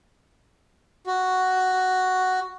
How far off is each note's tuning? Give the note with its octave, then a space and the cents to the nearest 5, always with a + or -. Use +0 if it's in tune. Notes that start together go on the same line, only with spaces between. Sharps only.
F#4 +5